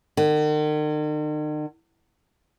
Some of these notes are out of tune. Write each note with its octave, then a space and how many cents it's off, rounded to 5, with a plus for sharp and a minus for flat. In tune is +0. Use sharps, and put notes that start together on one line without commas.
D#3 -45